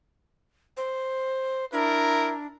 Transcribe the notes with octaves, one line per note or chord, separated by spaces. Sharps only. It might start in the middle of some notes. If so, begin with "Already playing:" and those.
C5
D4 E4 A#4